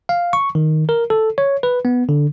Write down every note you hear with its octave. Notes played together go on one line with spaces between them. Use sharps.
F5
C#6
D#3
A#4
A4
C#5
B4
B3
D3